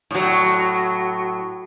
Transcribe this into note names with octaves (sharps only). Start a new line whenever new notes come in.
A2 F#3